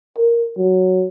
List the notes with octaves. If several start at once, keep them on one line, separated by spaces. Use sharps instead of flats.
A#4
F#3